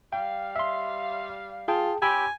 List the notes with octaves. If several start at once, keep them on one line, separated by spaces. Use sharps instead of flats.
G3 F5 G5
E5 C6
F4 G#4 G5 A5
C#4 F4 G4 G5 G#5 B5 E6